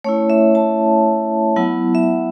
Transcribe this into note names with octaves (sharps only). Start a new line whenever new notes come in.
A3 C#4 E4 C#5
E5
A5
F#3 B3 E4 F#5
E5